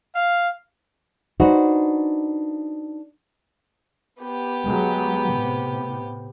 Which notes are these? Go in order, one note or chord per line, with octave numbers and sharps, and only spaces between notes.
F5
D4 D#4 F#4 B4 C5
B3 G4
F#3 G#3
A2 C3